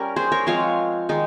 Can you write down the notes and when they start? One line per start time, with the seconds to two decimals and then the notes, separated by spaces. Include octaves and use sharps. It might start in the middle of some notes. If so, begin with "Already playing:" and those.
Already playing: G3 C#4 A#4
0.16 G#4 C5
0.32 A#4 C#5
0.47 F3 G#3 C4 C#5 F5
1.09 D#3 G#3 D#4